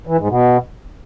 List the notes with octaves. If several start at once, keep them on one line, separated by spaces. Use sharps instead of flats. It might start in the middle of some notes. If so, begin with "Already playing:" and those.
E3
G#2
B2